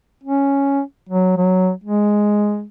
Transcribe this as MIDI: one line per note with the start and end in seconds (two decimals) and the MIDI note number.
0.24 0.81 61
1.09 1.34 54
1.37 1.71 54
1.84 2.65 56